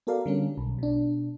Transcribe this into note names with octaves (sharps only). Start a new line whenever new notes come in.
B3 F#4 A4 A#4 D5 F5
D3 G3 C#4
B1
B2 D4